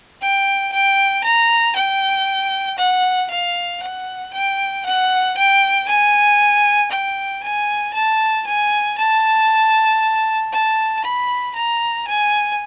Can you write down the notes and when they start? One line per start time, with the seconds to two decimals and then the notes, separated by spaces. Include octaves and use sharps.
0.21 G5
0.73 G5
1.24 A#5
1.76 G5
2.78 F#5
3.30 F5
3.82 F#5
4.33 G5
4.85 F#5
5.37 G5
5.88 G#5
6.91 G5
7.43 G#5
7.94 A5
8.46 G#5
8.97 A5
10.52 A5
11.04 B5
11.55 A#5
12.07 G#5